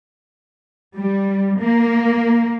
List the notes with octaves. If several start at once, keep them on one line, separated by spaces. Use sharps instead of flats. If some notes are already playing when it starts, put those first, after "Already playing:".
G3
A#3